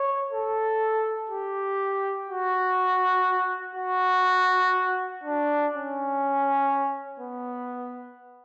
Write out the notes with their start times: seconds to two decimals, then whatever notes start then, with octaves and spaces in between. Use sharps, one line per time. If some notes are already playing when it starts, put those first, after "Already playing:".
Already playing: C#5
0.32 A4
1.29 G4
2.29 F#4
3.75 F#4
5.24 D4
5.73 C#4
7.19 B3